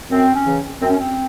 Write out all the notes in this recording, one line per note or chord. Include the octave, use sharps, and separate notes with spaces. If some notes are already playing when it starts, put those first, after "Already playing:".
F#2 C4
C#4
C#3 E3
F#2 C4
C#4
C4